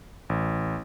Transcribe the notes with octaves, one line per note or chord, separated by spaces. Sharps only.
A1